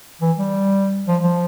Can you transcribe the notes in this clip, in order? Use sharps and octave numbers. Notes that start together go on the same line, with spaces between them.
E3
G3
F3
F3